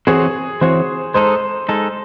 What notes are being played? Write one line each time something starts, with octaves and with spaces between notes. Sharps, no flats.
E3 C4 F#4 G#4 C#5
E3 C4 F#4 C5 C#5
G#3 D#4 A4 C5
G#3 D#4 A4